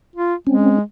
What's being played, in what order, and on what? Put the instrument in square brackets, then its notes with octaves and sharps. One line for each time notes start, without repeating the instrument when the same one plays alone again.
[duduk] F4
[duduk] G#3 [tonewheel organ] C4 C#4